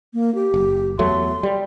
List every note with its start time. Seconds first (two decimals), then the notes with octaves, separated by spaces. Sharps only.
0.14 A#3
0.35 G4
0.54 F#1
0.99 E2 F#3 A3 C6
1.43 G3